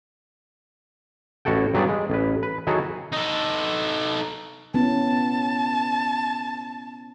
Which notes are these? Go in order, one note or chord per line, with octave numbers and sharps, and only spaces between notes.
A1 E4 F#4 A4 G5
G2 F#3 G3 B3 G#4 D5
G#3
A1 B4
B4
D#3 F#3 E4 F#4 G#4 A4
D#4 A4
B3 C#4 E4 A5